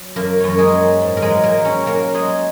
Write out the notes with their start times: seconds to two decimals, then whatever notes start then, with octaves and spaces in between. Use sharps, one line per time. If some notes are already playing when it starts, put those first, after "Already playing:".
Already playing: F#3
0.16 F#2 A#3 A#4
0.40 F#2 C#5
0.49 A#4
0.58 G#3 G#4
0.73 F#3
1.01 G#2
1.17 A#4
1.22 G#3 G#4
1.30 F#3
1.43 A#3 A#4
1.58 F#3
1.65 C#4 C#5
1.86 F#3 A#3 A#4
2.14 F#3 G#3 G#4